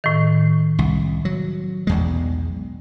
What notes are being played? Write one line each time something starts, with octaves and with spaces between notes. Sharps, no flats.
A2 D#3
C2
F#3
B1 E2 G#3